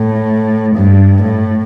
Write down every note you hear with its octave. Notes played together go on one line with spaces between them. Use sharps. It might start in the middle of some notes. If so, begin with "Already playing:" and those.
Already playing: A2
G2
A2